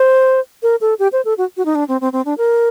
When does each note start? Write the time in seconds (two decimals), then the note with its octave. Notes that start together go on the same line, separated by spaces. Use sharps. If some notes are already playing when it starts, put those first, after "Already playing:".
Already playing: C5
0.63 A#4
0.81 A4
0.99 G4
1.12 C5
1.25 A4
1.38 F#4
1.57 F#4
1.65 D#4
1.75 D4
1.88 C4
2.01 C4
2.13 C4
2.25 D4
2.38 A#4